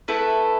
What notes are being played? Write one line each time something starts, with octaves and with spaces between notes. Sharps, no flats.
A3 E4 A4 B4